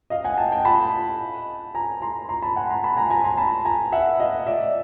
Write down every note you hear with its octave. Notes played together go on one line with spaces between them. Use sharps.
D#5 F5
F#5 G#5
G5 A5
G5 A5
A5 B5
G#5 A#5
A#5 C6
A#5 C6
A5 B5
F#5 G#5
A#5 C6
A5 B5
G#5 A#5
G#5 A#5
A#5 C6
A5 B5
G#5 A#5
E5 F#5
D#5 F5
D5 E5